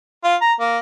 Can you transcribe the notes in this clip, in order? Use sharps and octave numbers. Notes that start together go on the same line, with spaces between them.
F4
A#5
A#3